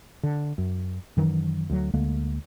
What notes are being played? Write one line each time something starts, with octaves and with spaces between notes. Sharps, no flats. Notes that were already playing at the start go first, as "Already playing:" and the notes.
D3
F#2
F#2 D#3 E3 F#3
D2 F#3
D2 D3 G#3 A#3